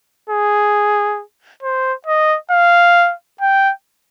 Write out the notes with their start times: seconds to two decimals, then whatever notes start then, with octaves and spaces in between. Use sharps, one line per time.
0.30 G#4
1.63 C5
2.07 D#5
2.51 F5
3.41 G5